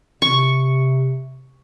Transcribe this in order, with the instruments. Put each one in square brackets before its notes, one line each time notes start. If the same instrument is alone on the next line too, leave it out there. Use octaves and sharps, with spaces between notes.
[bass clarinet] C3 [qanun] C#6